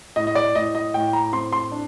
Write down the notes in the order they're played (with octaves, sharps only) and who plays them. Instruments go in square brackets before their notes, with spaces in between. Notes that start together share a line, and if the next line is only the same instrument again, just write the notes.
[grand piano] A2 D#5
D#5
D5
A2 D#5
D#5
A2 G5
A#5
C4 C6
C6
D4